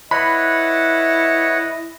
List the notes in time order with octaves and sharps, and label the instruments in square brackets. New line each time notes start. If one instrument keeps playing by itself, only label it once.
[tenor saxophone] E4 [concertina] B4 C#5 F#5 [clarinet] D#5 [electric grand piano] B5